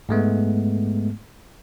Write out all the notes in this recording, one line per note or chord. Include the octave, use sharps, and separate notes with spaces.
G#2 G#3 A3 B3